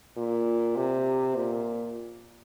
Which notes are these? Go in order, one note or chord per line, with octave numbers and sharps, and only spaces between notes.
A#2
C3
A#2